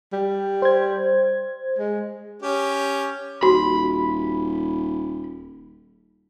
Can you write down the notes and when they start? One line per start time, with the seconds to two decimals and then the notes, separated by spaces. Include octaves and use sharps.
0.12 G3
0.62 C5 G#6
1.78 G#3
2.43 C#4 G4
3.43 D#1 F#4 B5